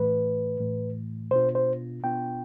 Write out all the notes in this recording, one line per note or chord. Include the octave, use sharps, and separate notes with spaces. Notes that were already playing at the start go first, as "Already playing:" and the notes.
Already playing: A2 E3 A3 B4
A2 E3 A3
B2 B3 D4 F4 C5
C5
B2 B3 D4 F4 G5